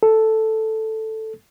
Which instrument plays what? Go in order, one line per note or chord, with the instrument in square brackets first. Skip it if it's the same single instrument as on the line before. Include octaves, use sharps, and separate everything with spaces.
[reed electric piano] A4